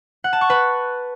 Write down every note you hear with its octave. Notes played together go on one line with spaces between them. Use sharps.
F#5
A5
C#6
B4